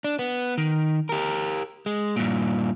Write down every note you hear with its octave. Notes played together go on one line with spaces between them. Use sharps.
D4
B3
D#3
G4 A#4
G#3
G2 A#2